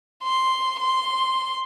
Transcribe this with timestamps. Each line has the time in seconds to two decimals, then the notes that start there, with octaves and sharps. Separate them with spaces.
0.23 C6
0.80 C6